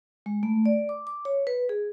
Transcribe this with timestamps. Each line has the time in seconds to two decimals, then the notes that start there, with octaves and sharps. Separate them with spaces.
0.26 G#3
0.43 A3
0.66 D5
0.89 D6
1.07 D6
1.25 C#5
1.47 B4
1.69 G#4